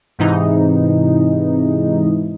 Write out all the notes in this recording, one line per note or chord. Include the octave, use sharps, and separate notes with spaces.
G#2 C3 E3 D#4